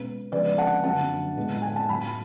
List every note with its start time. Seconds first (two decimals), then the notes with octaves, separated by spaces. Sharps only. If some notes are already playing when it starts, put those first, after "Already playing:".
Already playing: B2 G#3 C#4 B4
0.32 C#3 F3 G#3 B3 B4 D5
0.58 F#5 A5
0.84 F#2 D3 F#3 F#5 A5
1.37 A2 G#3 B3
1.62 G#5
1.76 A5
1.89 A2 F#3 B3 G#5 B5